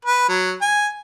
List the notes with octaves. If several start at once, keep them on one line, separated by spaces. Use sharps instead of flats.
B4
F#3
G#5